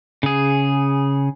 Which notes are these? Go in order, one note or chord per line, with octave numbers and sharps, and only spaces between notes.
C#3 G#4